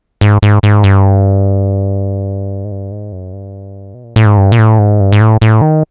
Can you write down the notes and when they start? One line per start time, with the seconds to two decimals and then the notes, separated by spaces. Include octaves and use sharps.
0.21 G#2
0.42 G#2
0.63 G#2
0.83 G2
2.65 G#2
2.71 G2
2.91 G#2
3.12 F#2
3.33 G2
3.94 B2
4.04 A#2
4.16 A2
4.26 G#2
4.37 G2
4.52 A#2
4.59 A2
4.79 G#2
5.00 G2
5.12 G#2
5.21 A2
5.41 A2
5.61 D#3